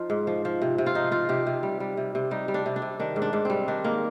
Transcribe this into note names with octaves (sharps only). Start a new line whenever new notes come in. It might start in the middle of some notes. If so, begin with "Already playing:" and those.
Already playing: F3 D#4 F4
G#2
F3
F3
C3
C3
F4
F3 D#4
F3 F4
C3 G4
C3
G3
G3
C3
C3
G3 D#4
G3
D4
C3
D4
C3
D#3 D4
G#2
D4
G#2
G3 C4
D#3 D4
G#2 A#3